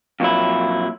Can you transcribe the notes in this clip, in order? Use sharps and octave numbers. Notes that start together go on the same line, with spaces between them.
F2 A#2 F#3 E4